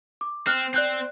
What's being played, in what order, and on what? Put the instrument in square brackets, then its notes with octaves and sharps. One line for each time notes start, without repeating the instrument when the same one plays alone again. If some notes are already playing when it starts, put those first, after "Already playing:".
[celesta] D6
[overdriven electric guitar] C4 [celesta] F6 F#6
[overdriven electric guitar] C4 [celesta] D5 F#6 G6